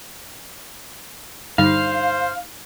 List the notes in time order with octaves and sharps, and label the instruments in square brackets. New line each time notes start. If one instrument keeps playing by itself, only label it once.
[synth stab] G2 D3 G3 [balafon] D#4 [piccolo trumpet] C5 [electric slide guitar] F5